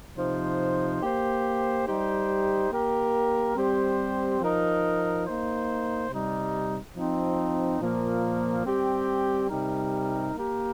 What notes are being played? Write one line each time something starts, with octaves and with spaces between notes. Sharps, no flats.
C3 F3 D#4 C5
A#3 G4 C5
G3 D#4 G4 C5
A#3 G4 A#4
G3 C4 G4 C5
F3 D#4 A#4
A#3 D#4 C5
C3 G3 D#4
F3 C4 D#4
A#2 F3 A#3
G3 C4 G4
C3 G3 D#4 A#4
A#3 G4 A#4